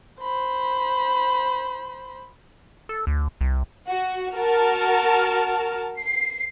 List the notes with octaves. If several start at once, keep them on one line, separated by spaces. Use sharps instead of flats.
C5 B5
A4
D2
C2
F#4
F#4 A#4 A5 F6
C7